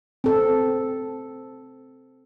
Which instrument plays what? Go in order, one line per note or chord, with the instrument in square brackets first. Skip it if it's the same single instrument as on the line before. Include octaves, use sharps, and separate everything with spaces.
[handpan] C4 A4